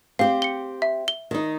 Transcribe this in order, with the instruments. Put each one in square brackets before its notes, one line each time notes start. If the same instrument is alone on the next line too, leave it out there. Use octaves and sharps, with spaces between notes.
[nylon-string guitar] C4 G4 [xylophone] F5
[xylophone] C#7 G7
E5
G7
[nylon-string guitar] D#3 D#4